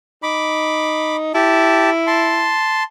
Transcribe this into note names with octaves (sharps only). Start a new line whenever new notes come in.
D#4 B5 D6
E4 G4 A5
A5 C6